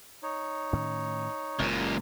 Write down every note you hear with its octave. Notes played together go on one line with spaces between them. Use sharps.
D#4 C#5
A2 D#3 C#4
F#1 C#2 A#2